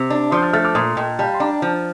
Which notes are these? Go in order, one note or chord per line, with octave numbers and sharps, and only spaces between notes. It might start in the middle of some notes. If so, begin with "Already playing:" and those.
Already playing: C3
D4
F3 C6 D#6
G6
F6 A6
A3 F6 A6
D6 F6
A#2 C6 D#6
A#2 D#5 G5
G3 F5 A5
C6
D4 G5 A#5
F3